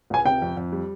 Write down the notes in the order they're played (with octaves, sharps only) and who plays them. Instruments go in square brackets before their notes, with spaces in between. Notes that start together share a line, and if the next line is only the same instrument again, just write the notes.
[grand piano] C#2 [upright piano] G#5
[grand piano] C3 [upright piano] G5
[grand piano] F2
F2
G3